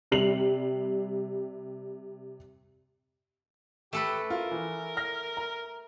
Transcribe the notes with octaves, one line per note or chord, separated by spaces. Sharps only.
C3 G3 C7 F7 F#7
A3 G4 A4 B4
F4 A#4
E3
F6 A#6
A#5